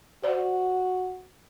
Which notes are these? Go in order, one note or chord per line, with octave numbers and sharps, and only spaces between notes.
F#4 C5 D5